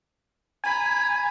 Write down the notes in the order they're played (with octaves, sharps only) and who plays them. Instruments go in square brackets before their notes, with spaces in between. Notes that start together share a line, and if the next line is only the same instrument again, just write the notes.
[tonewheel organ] G#5 [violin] A#5 B5